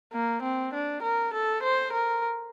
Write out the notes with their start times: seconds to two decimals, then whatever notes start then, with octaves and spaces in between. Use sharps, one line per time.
0.12 A#3
0.42 C4
0.73 D4
1.02 A#4
1.33 A4
1.63 C5
1.93 A#4